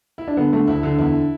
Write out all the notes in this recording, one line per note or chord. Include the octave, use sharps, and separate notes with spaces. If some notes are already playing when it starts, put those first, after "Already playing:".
E4
D4
D3 B3
D3 A3
D2 E4
D3
E2 E4